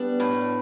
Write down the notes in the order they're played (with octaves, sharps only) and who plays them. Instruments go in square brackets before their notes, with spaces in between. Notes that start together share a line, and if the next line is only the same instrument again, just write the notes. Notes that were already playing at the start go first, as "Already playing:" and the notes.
Already playing: [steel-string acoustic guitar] G3 D4 [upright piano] B3
[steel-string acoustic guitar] A2